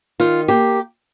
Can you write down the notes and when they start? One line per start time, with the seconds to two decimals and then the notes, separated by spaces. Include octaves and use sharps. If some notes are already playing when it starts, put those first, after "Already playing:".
0.20 D#3 F4
0.48 A#3 G4